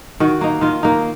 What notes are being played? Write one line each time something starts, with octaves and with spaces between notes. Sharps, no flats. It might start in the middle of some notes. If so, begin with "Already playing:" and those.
D#3 F#4
A#3 D#4
D#3 F4
A#3 D#4